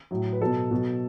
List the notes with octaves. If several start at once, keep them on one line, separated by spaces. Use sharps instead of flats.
A2 F#3
B4
B2 F#3 A4
B2 F#3